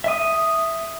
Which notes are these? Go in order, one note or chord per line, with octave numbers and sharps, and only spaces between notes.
E5 D#6